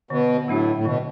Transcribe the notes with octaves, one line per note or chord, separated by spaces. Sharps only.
B2 D3
A2 F#3 A3 D4 F#4
A2
B2 D3